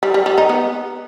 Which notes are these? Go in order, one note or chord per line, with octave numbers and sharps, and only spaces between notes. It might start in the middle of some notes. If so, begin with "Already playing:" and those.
G3
G3
G3
D#4
B3